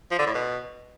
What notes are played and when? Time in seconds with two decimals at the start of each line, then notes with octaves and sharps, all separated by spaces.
0.11 F3
0.19 D3
0.27 A2
0.35 B2